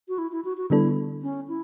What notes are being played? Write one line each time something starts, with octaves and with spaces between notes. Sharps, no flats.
F#4
E4
E4
F#4
F#4
D3 G3 B3 D4 E4 A4
C#4
E4